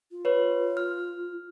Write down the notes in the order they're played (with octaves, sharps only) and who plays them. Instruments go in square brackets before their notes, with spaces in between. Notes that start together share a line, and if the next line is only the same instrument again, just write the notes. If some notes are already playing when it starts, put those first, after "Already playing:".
[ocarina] F4
[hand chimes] B4 C#5
F6